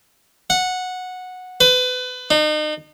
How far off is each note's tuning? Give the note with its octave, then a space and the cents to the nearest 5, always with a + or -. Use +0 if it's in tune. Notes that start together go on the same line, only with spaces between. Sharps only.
F#5 -10
B4 +30
D#4 -35